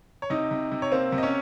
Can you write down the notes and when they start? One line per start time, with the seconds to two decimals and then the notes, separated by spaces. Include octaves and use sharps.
0.22 C#5
0.30 C3 D#4 D#5
0.51 C3
0.72 C3
0.82 C#5
0.92 A#3 C4 C5
1.12 C3
1.18 D#5
1.23 C#4 C#5